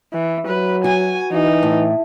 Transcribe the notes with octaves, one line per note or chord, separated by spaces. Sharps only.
E3
F#3 B4
F#4 G#5
E3 D#4
A2